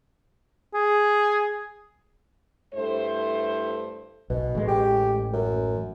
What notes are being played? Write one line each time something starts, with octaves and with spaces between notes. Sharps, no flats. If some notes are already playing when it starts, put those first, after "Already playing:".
G#4
G2 A3 E4 C5
B1 B2
A1 G#3
G4
F#2